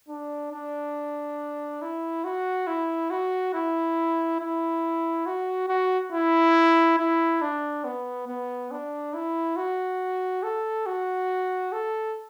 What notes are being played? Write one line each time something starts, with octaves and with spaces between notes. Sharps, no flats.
D4
D4
E4
F#4
E4
F#4
E4
E4
F#4
F#4
E4
E4
D4
B3
B3
D4
E4
F#4
A4
F#4
A4